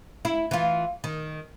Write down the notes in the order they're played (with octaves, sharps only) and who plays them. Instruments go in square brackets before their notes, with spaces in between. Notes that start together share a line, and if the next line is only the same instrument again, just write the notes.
[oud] E4
E3 F4
D#3